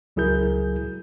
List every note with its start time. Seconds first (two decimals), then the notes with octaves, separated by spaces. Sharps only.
0.16 C#2 F#3 E4 G#4 A#4 G6